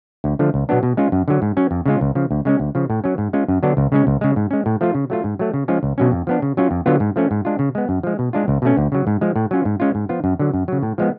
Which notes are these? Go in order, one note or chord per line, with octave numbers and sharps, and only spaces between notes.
D2
D3 F3 A3
C#2
B2 F#3 B3 D4
B2
G#3 C#4 F4
F#2
D3 F#3
G#2
F#3 C#4
F2
C#3 G#3 C#4 F4
C#2
C#3 F3
D2
C#3 G#3 C#4
D2
C#3 F3
A2
F#3 C#4
G#2
G#3 C#4 F4
F#2
D3 F#3 B3 D4
C#2
C#3 G#3 C#4
C#2
C#3 G#3
G#2
G#3 C#4
A2
F3 A3 F4
C#3
F#3 A3 F4
G#2
F#3 A3
C#3
F3 G#3 C#4 F4
C#2
B2 F#3 C#4
F2
F3 B3 D4
C#3
F#3 C#4 F4
F2
D3 F#3 B3 F4
G#2
F3 A3 C#4
G#2
G#3 D4 F4
C#3
G#3 B3
F#2
F3 G#3
B2
G#3 D4 F4
C#2
B2 A3 C#4
D2
C#3 F#3
G#2
F3 G#3
A2
F#3 C#4 F4
G#2
G#3 C#4 F4
G#2
F3 B3 F4
F#2
D3 F#3
F#2
C#3 F#3
A2
F3 G#3 B3